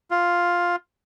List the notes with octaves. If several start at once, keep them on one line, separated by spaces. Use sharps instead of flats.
F4